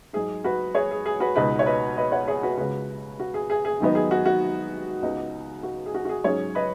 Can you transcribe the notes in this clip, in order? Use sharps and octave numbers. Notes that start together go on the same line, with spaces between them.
G#2 F#3 D#4 G#4
F#4 B4
G#4 C#5
G#4
G#4
F#4 B4
C#2 B2 G#3 B3 D#4 F#4 B4
C#5
B4 D#5
B4 D#5
C#5 F#5
G#4 C#5
F#4 B4
C#2 C#3 G#3 C#4 F#4 B4
F#4
G#4
G#4
G#4
G#2 D#3 F#3 B3 D#4
G#4
F#4
F#4
C#2 C#3 B3 D#4
F#4
G#4
F#4
F#4
G#4
G#2 F#3 C#4 G#4 C#5
B4 D#5